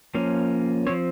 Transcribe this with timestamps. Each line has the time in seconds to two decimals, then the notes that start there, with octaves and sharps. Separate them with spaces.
0.15 F3 A#3 C#4
0.87 F3 C4 C#5